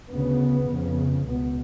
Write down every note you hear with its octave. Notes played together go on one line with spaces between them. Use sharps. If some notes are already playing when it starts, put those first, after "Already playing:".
D2 C#3 B3
F2 C#3
C#2 B2 B3